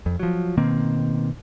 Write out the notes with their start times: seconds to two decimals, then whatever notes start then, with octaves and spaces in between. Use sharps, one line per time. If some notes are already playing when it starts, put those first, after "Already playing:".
0.06 F2
0.20 F3 F#3
0.57 B2 D#3 A#3 C4